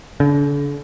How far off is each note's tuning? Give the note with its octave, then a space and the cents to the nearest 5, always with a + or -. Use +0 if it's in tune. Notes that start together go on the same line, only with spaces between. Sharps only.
D3 -40